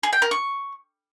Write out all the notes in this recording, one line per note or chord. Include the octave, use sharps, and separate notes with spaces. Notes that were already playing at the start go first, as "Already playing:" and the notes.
G#4
G5
A#4
C#6